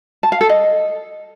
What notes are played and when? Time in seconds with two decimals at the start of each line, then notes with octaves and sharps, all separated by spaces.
0.23 A5
0.32 F5
0.41 A4
0.49 D#5